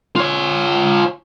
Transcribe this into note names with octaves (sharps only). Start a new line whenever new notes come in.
F4 C#5